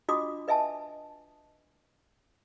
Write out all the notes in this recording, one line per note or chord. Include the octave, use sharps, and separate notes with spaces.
D4 F4 F#4 D#5 D6 D#6
B4 D#5 E5 G#5 A5